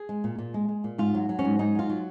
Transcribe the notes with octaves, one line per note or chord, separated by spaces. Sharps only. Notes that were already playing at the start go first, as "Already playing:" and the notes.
Already playing: G#4
G#3
A#2
A#2
G#3
G#3
A#2
G#2 F4
F#3
F#3
C#4
G#2
G#2 D#4
F#3 F4
F#3